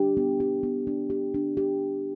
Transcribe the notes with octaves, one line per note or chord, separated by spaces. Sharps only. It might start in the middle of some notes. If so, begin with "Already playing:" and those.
Already playing: D4 G4
B3
G4
B3
D4
G4
D4
G4